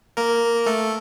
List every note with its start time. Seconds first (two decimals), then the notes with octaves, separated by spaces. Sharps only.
0.17 A#3 A#4
0.66 A3 A4